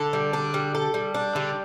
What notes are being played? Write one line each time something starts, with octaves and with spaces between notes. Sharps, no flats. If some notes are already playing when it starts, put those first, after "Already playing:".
Already playing: D3 A4
G3
D4
G3
A4
G3
D4
D3 G3